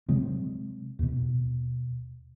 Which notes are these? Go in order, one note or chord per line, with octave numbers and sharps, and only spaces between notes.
C3 F#3 G#3 C4
D#2 B2